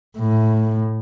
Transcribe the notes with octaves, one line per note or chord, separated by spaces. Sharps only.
A2